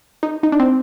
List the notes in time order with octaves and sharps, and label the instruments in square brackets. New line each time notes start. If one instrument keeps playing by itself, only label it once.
[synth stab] D#4
D#4
D4
C4